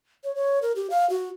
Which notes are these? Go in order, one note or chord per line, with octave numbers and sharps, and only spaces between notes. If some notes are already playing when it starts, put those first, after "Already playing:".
C#5
C#5
A#4
G4
F5
F#4